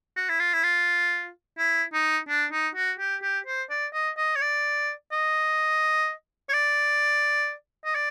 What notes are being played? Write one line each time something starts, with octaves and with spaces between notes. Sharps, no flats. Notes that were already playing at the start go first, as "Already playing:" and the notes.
F#4
E4
F4
E4
F4
E4
D#4
D4
D#4
F#4
G4
G4
C5
D5
D#5
D#5
C#5
D5
D#5
C#5
D5
D#5
D5